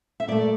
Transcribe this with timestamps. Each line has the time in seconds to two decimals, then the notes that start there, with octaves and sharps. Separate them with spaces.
0.20 E5
0.28 A#2 A3 D5